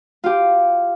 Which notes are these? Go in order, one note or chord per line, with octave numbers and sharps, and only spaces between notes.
F4 G4